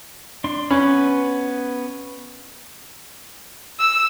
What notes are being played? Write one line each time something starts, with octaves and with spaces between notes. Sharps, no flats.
D4 C6
B3 C#4 B4 B5
E6